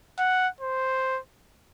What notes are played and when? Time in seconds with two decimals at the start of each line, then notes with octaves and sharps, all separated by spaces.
0.18 F#5
0.61 C5